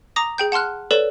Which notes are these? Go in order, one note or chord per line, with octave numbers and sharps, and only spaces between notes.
A#5 D6 D#6 A#6
G#4 G5 G6
F#5 A5 C6 F6 F#6
A4 B4 C#5 D5 E7